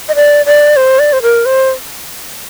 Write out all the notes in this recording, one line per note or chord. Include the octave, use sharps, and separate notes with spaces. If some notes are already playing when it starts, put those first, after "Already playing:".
D#5
D5
D5
C5
D5
C5
A#4
C5